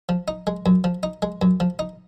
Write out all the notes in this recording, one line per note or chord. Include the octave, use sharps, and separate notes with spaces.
F3
D#4
G#3
F#2
F3
D#4
G#3
F#2
F3
D#4